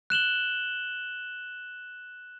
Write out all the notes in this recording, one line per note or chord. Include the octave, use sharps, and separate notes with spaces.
F#6 E7 F#7 G7